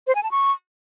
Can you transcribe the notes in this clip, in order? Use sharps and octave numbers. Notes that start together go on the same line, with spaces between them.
C5
G#5
A5
C#6